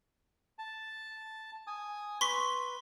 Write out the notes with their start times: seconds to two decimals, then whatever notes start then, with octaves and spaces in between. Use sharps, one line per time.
0.59 A5
1.67 G#5 D#6
2.21 B4 C6 C#6 B6